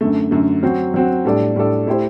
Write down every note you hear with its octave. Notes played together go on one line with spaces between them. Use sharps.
F#2 D3 A3
F#2 D3 A3
F#3 C4 F#4
F#3 C4 F#4
A2 G3 D4 A4 D5
A2 G3 D4 A4 D5
A3 E4 G4 C5